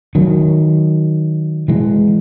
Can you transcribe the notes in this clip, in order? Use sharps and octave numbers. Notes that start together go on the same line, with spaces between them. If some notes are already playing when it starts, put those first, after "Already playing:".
D#3 F#3
E3 G#3